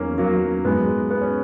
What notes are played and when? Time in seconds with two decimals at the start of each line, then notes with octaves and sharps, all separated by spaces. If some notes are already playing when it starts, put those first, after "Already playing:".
Already playing: E2 D#3 F#3 A#3 C#4
0.18 F#3 A#3
0.64 G#2 F#3 G#3 B3
1.10 B3
1.21 C#4